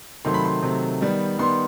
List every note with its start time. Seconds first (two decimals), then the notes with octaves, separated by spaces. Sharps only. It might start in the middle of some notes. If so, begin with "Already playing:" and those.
0.25 C3 D#3 F#3 A3 C6
0.34 B5
0.45 C6
0.62 C3 D#3 F#3 A3
1.01 D#3 G3 B3
1.38 D#3 G3 B3 C6